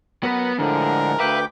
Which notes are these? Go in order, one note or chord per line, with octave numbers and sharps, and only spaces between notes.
F#3 B3 A#4 B4
A2 D3 F3 G#3 A#4
D2 B4 E5 F5 G5 D6